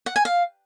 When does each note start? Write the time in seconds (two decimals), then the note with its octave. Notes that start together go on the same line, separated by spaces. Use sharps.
0.06 F#5
0.16 G#5
0.25 F5